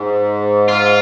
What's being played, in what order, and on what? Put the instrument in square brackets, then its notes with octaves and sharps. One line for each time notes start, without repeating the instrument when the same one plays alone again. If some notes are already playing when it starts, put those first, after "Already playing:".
Already playing: [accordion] G#2
[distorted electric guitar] F4